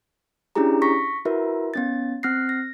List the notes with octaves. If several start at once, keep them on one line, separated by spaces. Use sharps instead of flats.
C#4 D4 E4 G4 G#4 A#5
C#6 A#6 B6
E4 F#4 A#4 B4 E5
B3 C#4 A6
C4 F6 F#6 A#6 C7
A#6